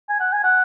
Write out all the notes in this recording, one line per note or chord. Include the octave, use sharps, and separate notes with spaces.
G#5
F#5
G#5
F#5